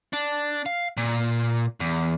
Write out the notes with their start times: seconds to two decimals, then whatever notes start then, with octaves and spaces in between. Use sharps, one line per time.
0.13 D4
0.66 F5
0.97 A#2
1.80 E2